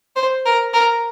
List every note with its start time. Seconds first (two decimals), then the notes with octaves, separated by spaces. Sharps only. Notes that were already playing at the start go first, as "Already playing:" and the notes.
0.16 C5
0.46 A#4
0.74 A#4